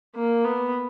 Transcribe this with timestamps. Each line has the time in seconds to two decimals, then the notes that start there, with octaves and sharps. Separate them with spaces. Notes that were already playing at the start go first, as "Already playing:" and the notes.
0.15 A#3
0.45 B3